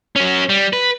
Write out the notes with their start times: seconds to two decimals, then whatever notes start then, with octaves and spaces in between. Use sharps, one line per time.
0.16 F#3 C#4
0.49 G3
0.73 B4